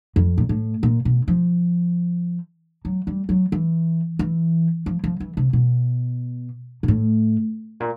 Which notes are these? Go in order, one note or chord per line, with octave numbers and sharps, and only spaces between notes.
F2
A#2
A2
A#2
B2
F3
F#3
G3
F#3
E3
E3
F3
F3
E3
C3
B2
A#2
A2
A#2